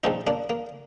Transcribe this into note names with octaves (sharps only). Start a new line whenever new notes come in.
A#1 A#2 F3 C4 D#4
A#3 D4
A#3